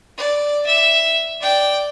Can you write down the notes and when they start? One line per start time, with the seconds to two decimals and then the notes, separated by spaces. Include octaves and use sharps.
0.18 D5
0.66 E5
1.41 D5 G5